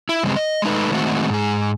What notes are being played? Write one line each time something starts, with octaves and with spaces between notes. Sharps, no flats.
E4
G2 C#3 G#3 C4
D#5
G#3 A3 D#4 B4
D#3 G#3 A3 C4 D#4 F#4
G#2 G#4